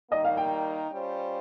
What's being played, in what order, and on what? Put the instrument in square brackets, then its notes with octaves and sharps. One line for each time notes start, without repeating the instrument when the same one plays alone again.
[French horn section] D#3 G3 A#3 D#4 [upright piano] D#5
[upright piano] F5
G5
[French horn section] G3 C#4 F4 C5